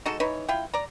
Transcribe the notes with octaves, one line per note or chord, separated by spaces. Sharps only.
G#3 D#4 F#4 A4
E3 D#4 B4 C#5
E4 F4 G5
D5 A#5